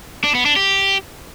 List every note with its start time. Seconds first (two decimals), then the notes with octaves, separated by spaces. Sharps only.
0.24 D4
0.35 B3
0.46 D4
0.56 G4